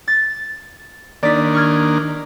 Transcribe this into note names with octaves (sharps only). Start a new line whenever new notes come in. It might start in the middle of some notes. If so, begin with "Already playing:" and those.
A6
D#3 A#3 D4 D5 B6
C#6 F6 G#6